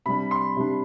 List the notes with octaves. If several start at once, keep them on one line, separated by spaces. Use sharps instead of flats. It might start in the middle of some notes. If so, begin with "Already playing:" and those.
C3 G3 D4 B5
C6
C3 G3 D4